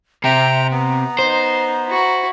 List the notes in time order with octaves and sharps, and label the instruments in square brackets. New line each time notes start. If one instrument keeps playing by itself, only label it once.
[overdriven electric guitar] C3 [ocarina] E5 [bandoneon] G5 A#5
[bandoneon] B3 [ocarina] A#5
[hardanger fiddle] D#4 [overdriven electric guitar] C5
[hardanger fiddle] E4 F#4